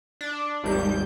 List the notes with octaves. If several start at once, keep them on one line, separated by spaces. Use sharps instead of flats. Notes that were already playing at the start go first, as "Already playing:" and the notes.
D4
G#1 D#2 G3 G6